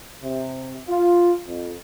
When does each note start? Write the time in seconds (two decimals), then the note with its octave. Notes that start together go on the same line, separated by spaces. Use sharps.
0.23 C3
0.88 F4
1.47 F2